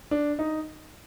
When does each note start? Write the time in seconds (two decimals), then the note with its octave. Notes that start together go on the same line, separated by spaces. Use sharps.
0.11 D4
0.39 D#4